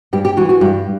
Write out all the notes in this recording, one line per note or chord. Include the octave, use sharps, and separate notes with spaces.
G2 G4
G4
E3 F#4
F#4
G2 G4